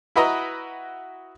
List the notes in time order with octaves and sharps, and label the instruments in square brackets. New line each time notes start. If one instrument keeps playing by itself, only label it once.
[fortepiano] E4 F#4 B4 D#5 A#5